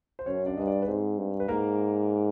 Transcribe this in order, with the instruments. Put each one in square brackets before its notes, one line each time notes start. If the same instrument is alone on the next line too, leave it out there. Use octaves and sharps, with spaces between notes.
[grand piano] C5
[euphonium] F#2 [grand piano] C#4 C#5
[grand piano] D4 D5
[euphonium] G2 [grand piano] D#5
[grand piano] D4 D5
B4
[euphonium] G#2 [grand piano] C4 C5
[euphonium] G2
[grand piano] B4
[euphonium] G#2 [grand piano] A#3 A#4